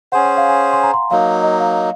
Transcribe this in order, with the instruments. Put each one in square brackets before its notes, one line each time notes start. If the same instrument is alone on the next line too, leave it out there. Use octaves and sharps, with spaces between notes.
[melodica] C#4 G#4 C5 [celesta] F#5
[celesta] G#5
F5
G#5
C6
A#5
C6
[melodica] F#3 A#3 D#4 [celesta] F5
[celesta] F5
D#5
F5